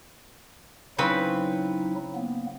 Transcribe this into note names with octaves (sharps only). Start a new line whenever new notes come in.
C#3 F#3 C4 D#4 E4 B4
A#3 B3